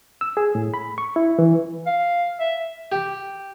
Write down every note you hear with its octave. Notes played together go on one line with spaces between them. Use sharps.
E6
G#4
A2
B5
C#6
E4
E3
F5
E5
G4